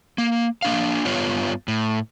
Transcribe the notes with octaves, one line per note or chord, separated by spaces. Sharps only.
A#3
A#3 D4 F5
G2 B3 F4 C#5
A2